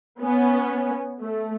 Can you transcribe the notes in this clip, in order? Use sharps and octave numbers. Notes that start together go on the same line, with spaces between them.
B3 C#4
A3